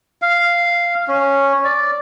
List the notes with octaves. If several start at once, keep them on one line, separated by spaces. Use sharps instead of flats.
F5
C#4
D5